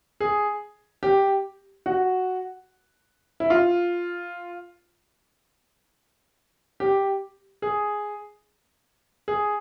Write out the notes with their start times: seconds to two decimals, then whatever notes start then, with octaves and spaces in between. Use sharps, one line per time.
0.20 G#4
1.03 G4
1.86 F#4
3.40 E4
3.50 F4
6.80 G4
7.62 G#4
9.28 G#4